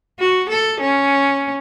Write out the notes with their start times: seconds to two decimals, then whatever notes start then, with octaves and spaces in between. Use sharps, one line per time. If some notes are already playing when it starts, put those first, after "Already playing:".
0.20 F#4
0.50 A4
0.80 C#4